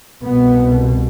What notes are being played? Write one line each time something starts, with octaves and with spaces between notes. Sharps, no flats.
C2 B2 B3